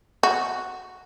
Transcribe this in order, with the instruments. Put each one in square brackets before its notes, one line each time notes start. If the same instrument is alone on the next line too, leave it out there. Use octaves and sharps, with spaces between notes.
[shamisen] F#4